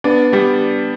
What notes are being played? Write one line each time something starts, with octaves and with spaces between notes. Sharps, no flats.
B3 D4
G3 B3